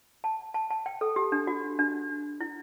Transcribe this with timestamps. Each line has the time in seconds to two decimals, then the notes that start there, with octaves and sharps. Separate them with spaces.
0.24 A5
0.54 A5
0.70 A5
0.86 G5
1.01 A4
1.16 G4
1.32 D4
1.47 F#4
1.79 D4
2.40 E4